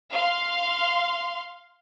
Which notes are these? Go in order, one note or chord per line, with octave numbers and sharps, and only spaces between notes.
F5 C6